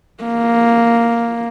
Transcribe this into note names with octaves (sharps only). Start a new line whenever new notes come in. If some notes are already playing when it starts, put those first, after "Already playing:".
A#3